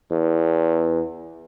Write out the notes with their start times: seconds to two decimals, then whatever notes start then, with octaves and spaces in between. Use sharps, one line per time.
0.11 E2